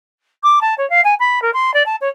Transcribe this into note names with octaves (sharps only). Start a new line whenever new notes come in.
D6
A5
C#5
F5
G#5
B5
A#4
C6
D5
A5
C#5